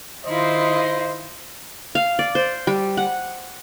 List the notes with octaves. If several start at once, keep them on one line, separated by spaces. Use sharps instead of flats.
D#3 E4 F4 C5 D#5
F5
D5
C5
G3
F#5